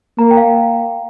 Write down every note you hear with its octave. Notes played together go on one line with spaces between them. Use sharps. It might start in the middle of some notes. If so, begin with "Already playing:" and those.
A#3 A#5
G5
F5